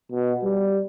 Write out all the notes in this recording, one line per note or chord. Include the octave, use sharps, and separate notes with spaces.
B2
G3